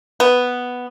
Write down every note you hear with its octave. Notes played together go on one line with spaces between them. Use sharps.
B3